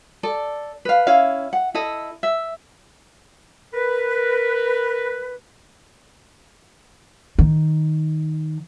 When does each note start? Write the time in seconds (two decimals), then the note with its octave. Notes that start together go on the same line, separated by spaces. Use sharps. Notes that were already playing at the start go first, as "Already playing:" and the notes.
0.23 A4 D5
0.85 B4 F5
1.07 C#4 E4 F5
1.53 F#5
1.74 E4 A4 D#5
2.23 E5
3.74 A#4 B4
7.39 D#3